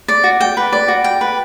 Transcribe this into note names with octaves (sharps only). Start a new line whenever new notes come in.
D5
F#4
G5
B4
D5
F#4
G5
B4